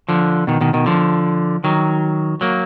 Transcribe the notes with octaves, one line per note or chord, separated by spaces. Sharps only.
D3 F3
B2 D#3
B2 D#3
B2 D#3
D3 F3
D#3 F#3
F#3 A#3